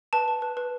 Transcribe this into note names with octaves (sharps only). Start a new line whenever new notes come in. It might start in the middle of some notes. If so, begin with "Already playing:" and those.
B4 A5
B4
B4
B4